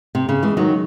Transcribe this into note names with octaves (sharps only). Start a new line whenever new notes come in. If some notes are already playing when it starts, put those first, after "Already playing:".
C3
C#3
E3 G#3
D#3 F#3